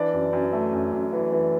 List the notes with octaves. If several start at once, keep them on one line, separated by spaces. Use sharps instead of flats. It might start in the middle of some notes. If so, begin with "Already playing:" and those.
Already playing: E3 D4 D5
F#2
F#2
A3
F#2
F#2
E3
E3